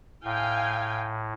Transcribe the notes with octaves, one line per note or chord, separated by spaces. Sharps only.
A2 F5 G5 G#5